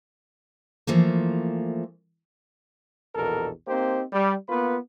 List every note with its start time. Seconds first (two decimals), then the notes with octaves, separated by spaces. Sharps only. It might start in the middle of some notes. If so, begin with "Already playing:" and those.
0.87 E3 F3 A3 A#3
3.15 A#1 E2 B2 A4 A#4
3.68 A#3 C4 D#4 G4 C5
4.13 G3
4.49 A#3 B3 F4 B4